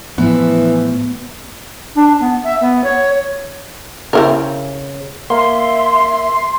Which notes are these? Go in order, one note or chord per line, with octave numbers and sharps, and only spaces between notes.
A2 E3 F3 B3
D4
B3
E5
B3
C#5
C#3 C4 E4 A#4
A#3 E5 C6